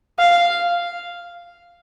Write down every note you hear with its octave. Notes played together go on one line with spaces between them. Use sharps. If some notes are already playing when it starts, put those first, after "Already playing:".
F5